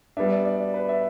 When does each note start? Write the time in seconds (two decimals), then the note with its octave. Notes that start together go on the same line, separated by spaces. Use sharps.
0.17 G3 B3 D4 E5
0.31 D5
0.45 D5
0.60 D5
0.74 B4
0.89 E5